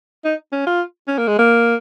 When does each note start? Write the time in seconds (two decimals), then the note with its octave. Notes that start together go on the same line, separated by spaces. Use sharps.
0.25 D#4
0.52 C#4
0.67 F4
1.08 C#4
1.18 A#3
1.28 G#3
1.39 A#3